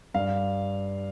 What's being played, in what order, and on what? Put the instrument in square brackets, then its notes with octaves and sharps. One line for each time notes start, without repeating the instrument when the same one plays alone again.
[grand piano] G2 F5